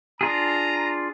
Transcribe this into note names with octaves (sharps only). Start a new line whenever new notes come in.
D4 F4 G#4 A#5